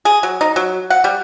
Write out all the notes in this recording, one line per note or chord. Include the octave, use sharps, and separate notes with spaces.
G#4
F#3
D#4
F#3
F#5
G3